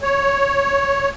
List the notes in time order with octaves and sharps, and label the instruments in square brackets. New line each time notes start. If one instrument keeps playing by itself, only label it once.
[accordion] C#5